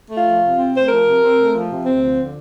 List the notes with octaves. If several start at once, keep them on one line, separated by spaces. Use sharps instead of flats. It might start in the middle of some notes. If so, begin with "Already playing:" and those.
A3
F4
F3
C3
C4
A3 C5
F3 A#4
C3
C4
A3
F3
C3
D2 C4
F3
D3